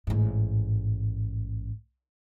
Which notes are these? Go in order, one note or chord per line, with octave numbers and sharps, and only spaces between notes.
A1 G#2